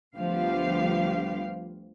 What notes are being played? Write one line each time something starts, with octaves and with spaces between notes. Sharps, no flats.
D2 F3 G3 B3 G4 F5